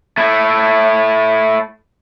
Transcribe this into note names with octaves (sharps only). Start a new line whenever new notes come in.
A3 E4